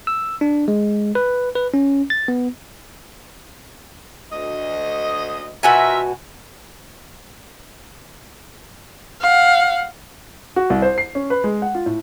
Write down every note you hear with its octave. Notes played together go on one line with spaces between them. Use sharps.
E6
D4
G#3
B4
B4
C#4
A6
B3
D2 D#5
B2 F4 F#4 A#4 E5 G#5
F5 F#5
F#4
C2
C5
C7
C#4
B4
G#3
F#5
F4
A2